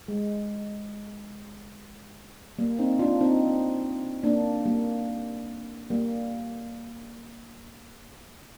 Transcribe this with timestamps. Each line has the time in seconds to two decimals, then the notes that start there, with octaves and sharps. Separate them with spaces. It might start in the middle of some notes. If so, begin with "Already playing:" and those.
0.08 G#3
2.59 G3 A#3
2.79 C4 D#4
2.99 D4 F4
3.21 C4 D#4
4.23 A#3 D4
4.66 G3 A#3
5.90 G3 A#3